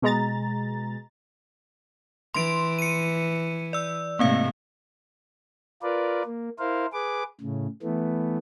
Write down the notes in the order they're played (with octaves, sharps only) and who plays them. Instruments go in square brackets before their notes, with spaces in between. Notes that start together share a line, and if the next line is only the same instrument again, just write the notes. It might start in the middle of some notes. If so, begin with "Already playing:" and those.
[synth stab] B2 G#3 A#5 A6
[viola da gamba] E3 [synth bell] C6 D7
[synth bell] C#7 D#7
D5 E6
[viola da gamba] G#2 C3 A3 [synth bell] A#3 C4 F5
[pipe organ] F4 A#4 B4 D5
A#3
E4 A#4 C5 F5
G#4 B4 D6
A2 C#3
E3 A3 B3